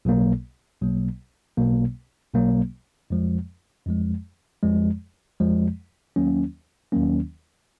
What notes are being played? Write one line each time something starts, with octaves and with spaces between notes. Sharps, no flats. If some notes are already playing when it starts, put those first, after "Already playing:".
B1 B2 F#3 A#3
B1 B2 F#3 A#3
B1 B2 F#3 A#3
B1 B2 F#3 A#3
F2 F3 G#3
F2 F3 G#3
F2 F3 G#3
F2 F3 G#3
D#2 D#3 F#3 A#3 C#4
D#2 D#3 F#3 A#3 C#4